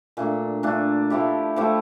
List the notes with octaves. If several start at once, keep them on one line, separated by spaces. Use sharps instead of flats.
A#2 A3 D4
A#2 A3 D4
F3 A3 E4 G4
F3 A3 E4 G4